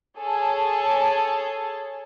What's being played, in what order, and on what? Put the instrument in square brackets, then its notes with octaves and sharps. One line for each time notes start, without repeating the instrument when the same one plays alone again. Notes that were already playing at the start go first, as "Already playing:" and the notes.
[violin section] G#4 A4 C#5 A5